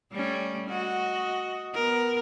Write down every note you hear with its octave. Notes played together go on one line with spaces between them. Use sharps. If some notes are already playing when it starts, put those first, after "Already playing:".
G3 A3 C#4
F#4 D#5
B3 A#4